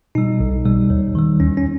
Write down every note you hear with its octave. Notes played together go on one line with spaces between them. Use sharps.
B2 G3 D#4
B1
B2 G3
D#2
D#3 G3
D#2 C#4
C#4